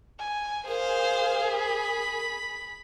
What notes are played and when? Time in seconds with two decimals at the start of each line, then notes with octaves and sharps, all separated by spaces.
0.19 G#5
0.68 G#4 A#4 C5 F5
1.53 B5